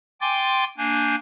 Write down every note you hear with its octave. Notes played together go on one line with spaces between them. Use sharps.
G5 G#5 C6 D6 A6
A#3 D4 G#5 G6